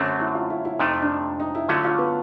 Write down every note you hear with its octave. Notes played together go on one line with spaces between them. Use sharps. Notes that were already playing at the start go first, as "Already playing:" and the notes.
Already playing: F#2 D3 F#3 A3 C4 C#4
E4
F4
E4
E4
F2 C3 F3 A3 D#4
D4
D#4
E4
D3 F#3 A3 C#4 F4
F4
B3